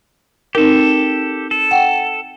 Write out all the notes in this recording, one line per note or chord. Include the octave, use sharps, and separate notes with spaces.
C4 D#4 G4 A4 A#4
A4
F#5 G5